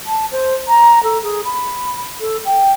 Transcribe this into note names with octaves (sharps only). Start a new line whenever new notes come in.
A5
C5
A#5
A4
G#4
B5
A4
G5